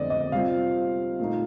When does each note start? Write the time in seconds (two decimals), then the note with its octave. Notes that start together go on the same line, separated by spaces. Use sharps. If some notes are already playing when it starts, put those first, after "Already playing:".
Already playing: F2 D3 A3 C4 D5 D#5
0.10 D#5
0.32 C3 G3 C4 F4 F5
1.19 A#2 A3 D#4